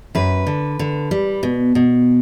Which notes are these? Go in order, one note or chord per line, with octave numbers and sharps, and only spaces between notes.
F#2 B4
D3
D3
G3
B2
B2